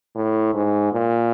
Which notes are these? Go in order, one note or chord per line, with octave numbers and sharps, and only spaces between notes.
A2
G#2
A#2